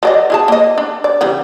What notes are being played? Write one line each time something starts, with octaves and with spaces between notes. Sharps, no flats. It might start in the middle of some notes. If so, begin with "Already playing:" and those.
F#3 D5 D#5
E4 G#4 A5
A#3 D#5
D4
D5
C#3 E3 G3